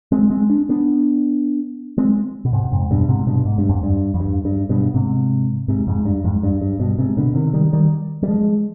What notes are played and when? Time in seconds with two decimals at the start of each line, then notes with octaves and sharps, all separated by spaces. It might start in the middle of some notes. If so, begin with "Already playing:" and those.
0.12 G#3 C4
0.30 G#3 C4
0.50 D4
0.69 B3 D4
1.98 G#3 C4
2.45 B2
2.53 G#2 C3
2.71 F2 G#2
2.91 G2 B2
3.08 G#2 C3
3.27 G2 B2
3.46 G#2
3.58 G2
3.69 F2 G#2
3.83 G2
4.14 F2
4.20 G2
4.45 G2
4.69 G2 B2
4.94 G#2 C3
5.68 G#2 C3
5.87 F2 G#2
6.05 G2
6.24 F2 G#2
6.43 G2
6.61 G2
6.79 G2 B2
6.98 G#2 C3
7.17 B2 D3
7.35 C3 D#3
7.53 D#3 G3
7.73 D#3 G3
8.23 G3
8.28 F3 G#3